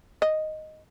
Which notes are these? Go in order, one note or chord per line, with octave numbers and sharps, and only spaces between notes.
D#5